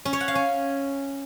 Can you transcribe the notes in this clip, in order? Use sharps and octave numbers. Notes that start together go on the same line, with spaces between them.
C#4
C#5
F#5
F5
C#4